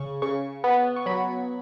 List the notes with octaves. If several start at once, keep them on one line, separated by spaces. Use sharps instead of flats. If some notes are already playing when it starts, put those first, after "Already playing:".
Already playing: C#3 C#6
C#3 C#6
B3
C#6
F#3 B5